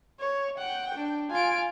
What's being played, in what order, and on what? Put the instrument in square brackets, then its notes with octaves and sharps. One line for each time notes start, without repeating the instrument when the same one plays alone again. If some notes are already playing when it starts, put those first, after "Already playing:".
[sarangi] C#5
[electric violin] F#5 [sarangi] G5
[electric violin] D4
[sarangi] F4 [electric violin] G#5 D7